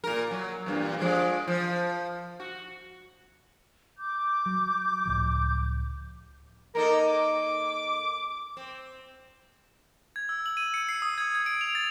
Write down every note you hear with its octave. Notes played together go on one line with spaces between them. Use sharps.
A#2 A#4
F#3
E2 G2 A#2
F3 G#3 D4
F3
F#4
D6 G6
F#3
C#2 A2 F3
A#3 D#4 A4 A#4
D6
C4
G#6
E6
F#7
D#7
C#7
C7
D#6
G#6
G#6
D7
F7
A6